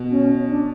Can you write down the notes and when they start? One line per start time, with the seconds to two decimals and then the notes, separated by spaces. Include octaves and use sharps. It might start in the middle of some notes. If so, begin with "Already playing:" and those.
Already playing: B2
0.11 C#4
0.48 D4